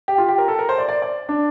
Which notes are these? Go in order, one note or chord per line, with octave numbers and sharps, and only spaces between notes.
G4
F4
G4
A#4
A4
A#4
C5
D5
D5
D5
D4